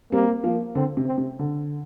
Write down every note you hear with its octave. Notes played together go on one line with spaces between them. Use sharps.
G3 A#3 C4
F3 A#3
D3 C4
C3
C4
C3
D3